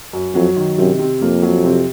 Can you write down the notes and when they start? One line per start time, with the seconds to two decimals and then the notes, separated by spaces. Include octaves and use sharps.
0.13 F#2
0.34 F2 F#3
0.56 D#3
0.78 F#2 C3
0.99 C3
1.21 F2 A#3
1.43 F#3
1.64 C3